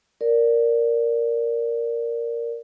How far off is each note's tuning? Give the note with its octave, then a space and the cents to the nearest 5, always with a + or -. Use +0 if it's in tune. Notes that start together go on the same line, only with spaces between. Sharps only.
A#4 +0 D5 -5